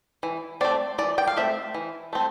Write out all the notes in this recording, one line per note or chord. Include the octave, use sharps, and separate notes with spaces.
E3
A3 C4 D5
E3 D5
G5
F5
A3 C4 E5
E3
A3 C4